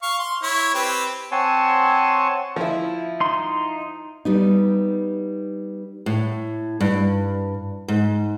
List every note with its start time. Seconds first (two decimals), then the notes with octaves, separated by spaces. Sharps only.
0.02 F5 C#6
0.19 C6
0.43 E4 C#5
0.74 C4 G4 B4
1.32 C4 C#5 F#5 G#5 A5 C6
2.56 F3 E4
3.20 D#4 C6
4.25 G3 B3 D#4
6.06 A2
6.80 G2
7.88 G#2